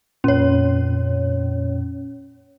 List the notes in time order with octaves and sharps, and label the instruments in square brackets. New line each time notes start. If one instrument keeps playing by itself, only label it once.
[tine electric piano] F2 A#2 [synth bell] C#4 C#5